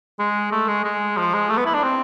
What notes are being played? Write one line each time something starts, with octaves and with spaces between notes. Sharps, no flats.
G#3
A3
G#3
G#3
F3
G#3
A3
B3
E4
D4
C4